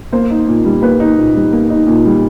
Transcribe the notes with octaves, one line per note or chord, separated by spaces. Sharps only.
A#3 C5
D#4
A#2
G3
A#3 B4
D#4
A#2
G3
A#3
D#4
A#2
G3